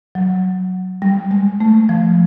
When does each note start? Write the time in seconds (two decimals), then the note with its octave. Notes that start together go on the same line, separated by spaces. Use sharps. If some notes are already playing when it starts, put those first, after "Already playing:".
0.15 F#3
1.02 G3
1.31 G#3
1.60 A3
1.89 F3